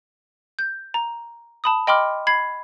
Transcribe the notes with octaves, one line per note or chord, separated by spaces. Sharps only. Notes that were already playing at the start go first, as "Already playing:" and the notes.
G6
A#5
A5 B5 D#6
D#5 G5 B5 C6 D6 F6
B5 G#6 C7